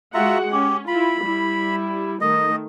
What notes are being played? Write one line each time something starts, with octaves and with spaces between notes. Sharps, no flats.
G#3 F4 F#4 E5 F#5 A#5
C#4 G4
E4 F4 B5
G3 E4
D#3 A3 D#5